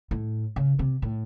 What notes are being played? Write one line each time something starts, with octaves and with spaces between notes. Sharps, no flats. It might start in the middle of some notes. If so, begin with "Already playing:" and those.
A2
C#3
C3
A2